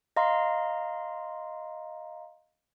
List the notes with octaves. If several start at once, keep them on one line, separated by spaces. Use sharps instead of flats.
D#5 F5 A#5 C6